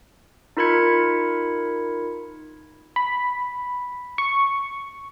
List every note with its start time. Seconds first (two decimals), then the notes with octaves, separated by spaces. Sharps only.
0.57 D#4 F4 A#4 B5 G#6 C#7
2.96 B5
4.18 C#6